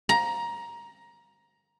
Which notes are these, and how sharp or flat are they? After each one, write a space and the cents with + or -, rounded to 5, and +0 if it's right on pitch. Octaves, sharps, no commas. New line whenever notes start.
A#5 +15